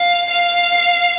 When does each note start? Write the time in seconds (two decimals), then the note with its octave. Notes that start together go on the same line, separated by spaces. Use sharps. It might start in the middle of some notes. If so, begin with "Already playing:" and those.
Already playing: F5
0.30 F5